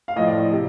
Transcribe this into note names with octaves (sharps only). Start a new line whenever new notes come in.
F5
A2 F3 D#5
D5
D#5
C3